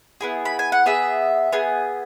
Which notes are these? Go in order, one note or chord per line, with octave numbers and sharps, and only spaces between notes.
B3 E4 G#4
B5
G#5
F#5
B3 G#4 E5
B3 G#4